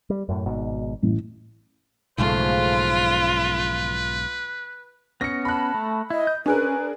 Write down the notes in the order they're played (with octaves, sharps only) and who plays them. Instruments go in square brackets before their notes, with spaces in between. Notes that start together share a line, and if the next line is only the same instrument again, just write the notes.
[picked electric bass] G3
F#2 A2
G#1 G#2 B2
[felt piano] A1
[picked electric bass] B1 G#2 [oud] C#3 F3 A3 [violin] F4 [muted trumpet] B4
[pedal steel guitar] B3 C#4 [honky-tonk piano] A#6 C#7
[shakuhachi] A5 [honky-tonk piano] B5 F#6
[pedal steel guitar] A3
[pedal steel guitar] E4 [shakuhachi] D#5
[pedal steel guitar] G6
[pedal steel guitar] C#4 G#5 F#6 [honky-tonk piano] D4 G#4 A#4 [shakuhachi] B4